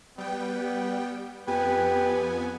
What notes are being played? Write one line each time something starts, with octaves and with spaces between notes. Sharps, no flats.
G3 B3 G5
F2 B3 G4 B4 G#5